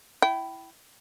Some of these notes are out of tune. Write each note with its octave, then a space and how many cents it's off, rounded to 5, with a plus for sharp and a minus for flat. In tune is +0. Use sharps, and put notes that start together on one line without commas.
E4 +5 G5 -25